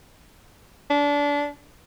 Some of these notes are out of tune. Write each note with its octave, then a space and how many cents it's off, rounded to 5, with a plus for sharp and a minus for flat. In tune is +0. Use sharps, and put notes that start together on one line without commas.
D4 -25